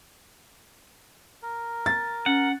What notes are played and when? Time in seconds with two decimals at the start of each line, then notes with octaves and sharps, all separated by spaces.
1.43 A#4
1.86 A6
2.26 C#4 F#5